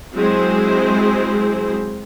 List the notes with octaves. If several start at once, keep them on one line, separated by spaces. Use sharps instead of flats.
F#3 G#3 C4 E4 G#4 C5